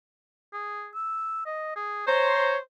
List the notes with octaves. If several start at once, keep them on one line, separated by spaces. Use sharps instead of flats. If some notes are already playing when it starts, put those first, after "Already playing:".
G#4
E6
D#5
G#4
C5 C#5 A#5